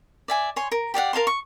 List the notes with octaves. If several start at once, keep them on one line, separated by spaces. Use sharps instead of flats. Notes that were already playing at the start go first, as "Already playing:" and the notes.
D5 E5 G#5
C#5 G#5 C6
A#4
G4 D5 F5 F#5
A#4 F5 A5 C6
C#6